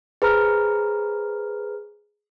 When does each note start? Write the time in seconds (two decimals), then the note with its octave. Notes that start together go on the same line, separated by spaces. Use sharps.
0.22 G#4 B4 C5 A#5 F6